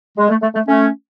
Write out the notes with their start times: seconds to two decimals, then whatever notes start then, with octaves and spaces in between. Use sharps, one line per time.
0.18 G#3
0.30 A3
0.42 A3
0.55 A3
0.67 A3 C#4